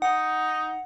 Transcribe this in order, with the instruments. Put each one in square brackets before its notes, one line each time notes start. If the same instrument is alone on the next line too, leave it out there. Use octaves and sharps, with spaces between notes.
[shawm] D#4 [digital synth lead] F#5